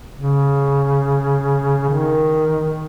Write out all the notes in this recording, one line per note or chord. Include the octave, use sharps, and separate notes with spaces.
C#3
D#3